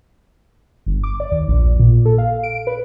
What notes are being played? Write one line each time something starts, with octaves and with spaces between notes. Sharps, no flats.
G1
D6
D5
D#2
A#1
A#2
A4
F5
D7
B4